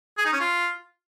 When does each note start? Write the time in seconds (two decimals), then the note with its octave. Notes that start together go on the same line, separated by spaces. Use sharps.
0.18 G#4
0.25 D#4
0.33 C#4
0.40 F4